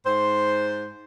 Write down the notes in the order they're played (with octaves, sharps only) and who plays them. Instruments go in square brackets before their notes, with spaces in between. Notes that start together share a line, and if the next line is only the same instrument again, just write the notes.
[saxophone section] G#2 C5